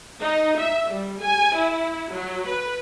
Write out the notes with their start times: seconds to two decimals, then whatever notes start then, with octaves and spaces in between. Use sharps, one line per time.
0.19 D#4
0.57 E5
0.89 G3
1.21 G#5
1.55 E4
2.11 F#3
2.47 B4